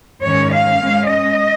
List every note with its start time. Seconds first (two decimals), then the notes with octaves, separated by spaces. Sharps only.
0.23 G#2 D#3 G#3 C#4 C#5
0.52 F5
0.81 G#2 G#3 C#4
1.08 D#5